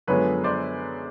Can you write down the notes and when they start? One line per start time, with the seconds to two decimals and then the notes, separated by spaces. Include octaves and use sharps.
0.07 F#2 D3 F3 G#3 B3 B4 C#5
0.44 C5 D5